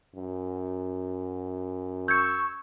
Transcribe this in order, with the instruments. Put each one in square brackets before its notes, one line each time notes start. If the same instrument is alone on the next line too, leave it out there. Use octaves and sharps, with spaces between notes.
[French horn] F#2
[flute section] C#6 E6 [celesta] G6 G#6 C#7